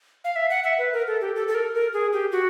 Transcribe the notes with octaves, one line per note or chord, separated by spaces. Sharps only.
F5
E5
F#5
E5
B4
A#4
A4
G4
A4
A4
A#4
A#4
G#4
G4
F#4